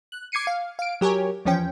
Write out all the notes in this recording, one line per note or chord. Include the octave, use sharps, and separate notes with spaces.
F#6
D6 G#6 C7 C#7 D#7
F5
F5 D7
F#3 G4 A#4 C#5 G#5
E2 F3 C#4 G5